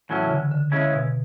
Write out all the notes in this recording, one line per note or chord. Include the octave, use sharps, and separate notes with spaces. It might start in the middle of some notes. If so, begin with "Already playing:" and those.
A2 E3 F#3 C#4 E4
C#3
D3
D3
C#3 G#3 C#4 E4
B2